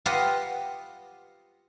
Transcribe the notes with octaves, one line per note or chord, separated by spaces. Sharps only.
F4 G4 B4 C5 D#5 F#5